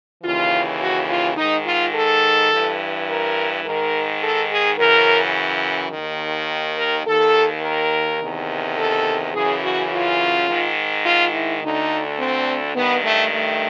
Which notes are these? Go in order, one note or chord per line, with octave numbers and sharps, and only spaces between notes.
D#2 C#3 E3 F4
F#4
F4
G#2 D#3 D#4
F4
A4
G2 E3
A#4
G#2 D#3 A#4
A4
G#4
F#2 C#3 E3 A#4
D#2 D#3
A#4
D#2 D#3 A4
A#4
E2 C3 D#3
A4
F#2 C#3 E3 G#4
F#4
F4
G#2 D#3
F4
E4
D2 D3 D#4
C4
G2 D#3 B3
A3
A3